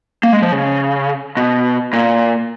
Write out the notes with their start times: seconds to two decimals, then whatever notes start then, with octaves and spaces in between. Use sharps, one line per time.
0.23 A#3
0.33 G#3
0.42 F3
0.52 C#3
1.37 B2
1.93 A#2